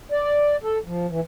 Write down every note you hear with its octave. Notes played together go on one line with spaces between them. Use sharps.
D5
A4
F3
E3